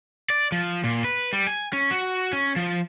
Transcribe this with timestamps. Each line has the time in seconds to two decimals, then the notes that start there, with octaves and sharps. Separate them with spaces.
0.30 D5
0.52 F3
0.84 A#2
1.04 B4
1.33 G3
1.47 G#5
1.73 C#4
1.91 F#4
2.33 C#4
2.56 F3